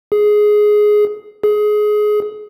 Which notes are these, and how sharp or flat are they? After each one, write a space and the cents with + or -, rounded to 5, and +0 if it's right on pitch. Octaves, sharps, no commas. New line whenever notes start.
G#4 +10
G#4 +20